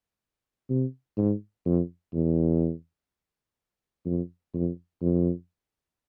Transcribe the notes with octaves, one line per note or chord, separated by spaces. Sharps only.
C3
G#2
F2
E2
F2
F2
F2